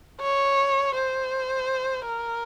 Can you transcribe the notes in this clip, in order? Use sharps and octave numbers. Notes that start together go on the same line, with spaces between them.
C#5
C5
A#4